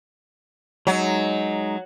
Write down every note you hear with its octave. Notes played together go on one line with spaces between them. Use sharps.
F#3 G#3 D#4